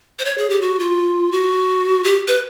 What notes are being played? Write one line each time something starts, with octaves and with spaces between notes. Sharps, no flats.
C5
C#5
G#4
G4
F#4
F4
F#4
G4
B4